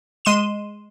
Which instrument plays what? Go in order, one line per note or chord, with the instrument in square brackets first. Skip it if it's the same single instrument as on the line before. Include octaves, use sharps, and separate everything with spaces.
[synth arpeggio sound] G#3 C6 D#7 E7